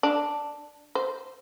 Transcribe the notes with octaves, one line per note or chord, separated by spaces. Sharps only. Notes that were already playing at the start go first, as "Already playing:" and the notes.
D4
C5